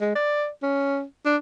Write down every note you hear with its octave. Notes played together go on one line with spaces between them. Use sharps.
G#3
D5
C#4
D4